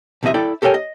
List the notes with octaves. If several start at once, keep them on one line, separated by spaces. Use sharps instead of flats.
B1 C3 E3 F#4 D#5 E5
E4 A4 D5 G5
G4 A4 A#4 C#5 G5 G#5
D#5